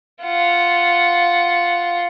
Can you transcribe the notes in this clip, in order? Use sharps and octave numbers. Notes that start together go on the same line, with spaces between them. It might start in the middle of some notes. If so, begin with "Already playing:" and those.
F4 F#5